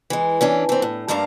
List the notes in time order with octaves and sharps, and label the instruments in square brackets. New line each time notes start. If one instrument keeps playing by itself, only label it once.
[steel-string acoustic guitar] E3 G#3
E3 C#4 D4
E3 C4
A2
G2 A3 A#3 D4 F5 A#5